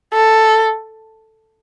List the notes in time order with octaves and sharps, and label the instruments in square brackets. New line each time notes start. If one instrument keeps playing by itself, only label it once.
[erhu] A4